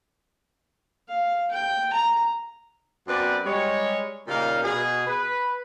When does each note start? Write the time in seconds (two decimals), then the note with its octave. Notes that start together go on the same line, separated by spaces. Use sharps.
1.08 F5
1.51 G5
1.93 A#5
3.08 F#2 B3 C4 B4 D5
3.45 G3 G#3 C#5
4.28 A#2 C#3 G3 A#3 D#4 F5
4.63 B2 G#4
5.07 B4